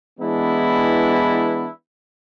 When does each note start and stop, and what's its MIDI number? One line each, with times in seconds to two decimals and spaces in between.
0.19 1.69 52
0.19 1.69 56
0.19 1.69 59
0.19 1.69 62
0.19 1.69 64